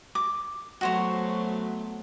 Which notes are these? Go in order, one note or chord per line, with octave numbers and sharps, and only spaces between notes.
D6
F#3 A3 B3 F#4 C5 C#5